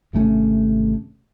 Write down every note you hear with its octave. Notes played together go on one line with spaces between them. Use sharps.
G#1 C3 A3 C#4